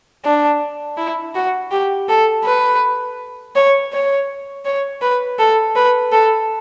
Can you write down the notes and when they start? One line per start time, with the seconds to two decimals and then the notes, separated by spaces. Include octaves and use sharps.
0.25 D4
0.97 E4
1.35 F#4
1.71 G4
2.09 A4
2.44 B4
3.56 C#5
3.93 C#5
4.65 C#5
5.02 B4
5.39 A4
5.76 B4
6.13 A4